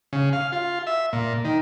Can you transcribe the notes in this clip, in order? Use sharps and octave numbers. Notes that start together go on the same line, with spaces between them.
C#3
F5
F4
E5
A#2
D#3